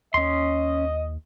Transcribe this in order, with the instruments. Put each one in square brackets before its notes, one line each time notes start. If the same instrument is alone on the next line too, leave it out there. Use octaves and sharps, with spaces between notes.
[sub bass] D#2 [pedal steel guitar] C#4 C6 [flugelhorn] D#5